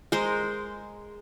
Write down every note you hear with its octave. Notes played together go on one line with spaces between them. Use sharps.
G#3 A#4 C5